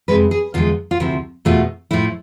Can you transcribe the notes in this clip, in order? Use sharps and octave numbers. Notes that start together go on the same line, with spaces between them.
F2 C3 G#3 B4
G#4
E2 D3 F3 G#3 F4
F4
D2 C3 F3 E4
E2 B2 A3 F4
A2 F3 A3 E4